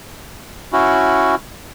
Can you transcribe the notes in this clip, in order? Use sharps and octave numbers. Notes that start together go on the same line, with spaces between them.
C#4 E4 F#4